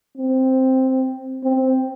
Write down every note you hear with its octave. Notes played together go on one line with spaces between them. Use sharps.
C4
C4